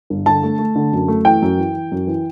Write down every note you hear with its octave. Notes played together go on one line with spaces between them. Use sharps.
G1
D3 A5
A3
A3
D3
F#2
A3
E3 G5
F#2
E3
E3
F#2
E3